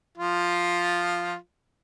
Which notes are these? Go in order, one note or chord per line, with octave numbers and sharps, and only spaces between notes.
F3 F4